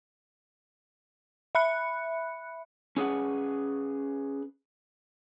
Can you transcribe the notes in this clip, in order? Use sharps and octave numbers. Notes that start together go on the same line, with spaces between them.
E5 B5 F#6 C#7
C#4 G#4 B4 F#5